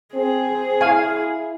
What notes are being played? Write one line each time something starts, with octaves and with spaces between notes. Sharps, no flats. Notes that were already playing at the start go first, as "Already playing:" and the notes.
C4 G#4
E4 F5 G#5